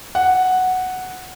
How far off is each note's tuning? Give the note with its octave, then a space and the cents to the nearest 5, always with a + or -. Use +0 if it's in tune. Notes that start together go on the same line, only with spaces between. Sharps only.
F#5 +0